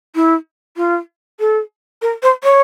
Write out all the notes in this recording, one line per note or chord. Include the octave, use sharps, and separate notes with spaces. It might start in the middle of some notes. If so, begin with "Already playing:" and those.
E4
F4
A4
A#4
C5
C#5